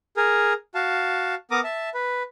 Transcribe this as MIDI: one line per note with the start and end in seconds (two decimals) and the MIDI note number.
0.17 0.53 68
0.17 0.53 70
0.75 1.35 66
0.75 1.35 77
0.75 1.35 81
1.51 1.60 59
1.51 1.60 70
1.51 1.60 82
1.51 1.60 86
1.51 1.60 87
1.64 1.89 76
1.64 1.89 81
1.94 2.23 71